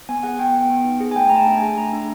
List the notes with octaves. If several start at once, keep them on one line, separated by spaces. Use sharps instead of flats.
B3 G#5
G#4 F#5
B3 G5
B3
B3
D#4
G#4
G#5
A3 G5
A3 A#5
A5
D4
G#4 G#5
A3 A#5
D4